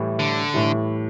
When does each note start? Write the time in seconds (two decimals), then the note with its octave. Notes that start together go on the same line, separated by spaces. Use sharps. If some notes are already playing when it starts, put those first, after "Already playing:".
Already playing: A2 E3 G3
0.19 D3
0.54 A2 E3 G3